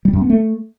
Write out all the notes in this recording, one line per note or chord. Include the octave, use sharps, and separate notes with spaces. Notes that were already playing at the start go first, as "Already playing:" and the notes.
G3
F#2
B3
A3